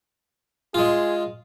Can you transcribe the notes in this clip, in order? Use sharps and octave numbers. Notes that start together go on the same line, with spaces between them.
G#3 F4 G#4